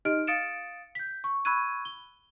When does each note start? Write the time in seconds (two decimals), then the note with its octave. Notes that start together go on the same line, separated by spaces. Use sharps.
0.05 D#4 G4 D#5 F6 D7
0.27 F5 D#6 A6 C#7 D7 E7
0.95 G6 B6
1.24 C#6
1.45 B5 C#6 E6 F#6 G#6 D#7
1.85 G7